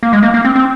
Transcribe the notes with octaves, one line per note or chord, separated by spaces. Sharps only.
A#3
G#3
A#3
A#3
C4
C4